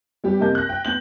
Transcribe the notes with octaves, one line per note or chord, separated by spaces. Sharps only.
G3 B3 G4
C3 A#3 A#4 D#5 A5 G6
F#6 A#6
G5
B3 G6 F#7